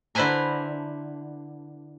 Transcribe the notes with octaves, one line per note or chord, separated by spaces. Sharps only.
D3 E4 B4 C5 G#5 A#5